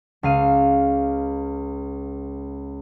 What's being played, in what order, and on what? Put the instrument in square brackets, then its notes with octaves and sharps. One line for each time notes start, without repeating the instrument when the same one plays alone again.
[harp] C#2 F5 D#7